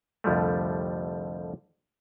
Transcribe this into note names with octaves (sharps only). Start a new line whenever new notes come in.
C2 F2 D3 F3 G3 A3